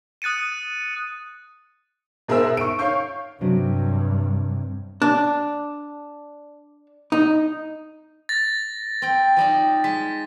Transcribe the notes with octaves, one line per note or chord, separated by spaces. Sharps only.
D#6 F#6 A6 C#7 D#7
B2 G#4 A#4 C5 E5 E6
C#6 D7
C#5 F5 C#6 G6
G2 C3 F#3 D4
D4
D#4
A6 A#6
C4 G5
F3 G3 D#4
G#3 B6